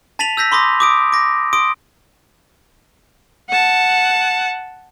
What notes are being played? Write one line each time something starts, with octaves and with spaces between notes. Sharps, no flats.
A5 A6 B6 D#7 F7 F#7
E6 G6 A#6 B6
B5 C6 D6 D#6 A#6
D6 D#6 D7
D6 A#6
C6 D#6 D7
F#5 A5